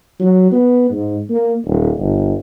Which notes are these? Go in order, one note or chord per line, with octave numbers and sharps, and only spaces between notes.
F#3
B3
G#2
A#3
D#1
G1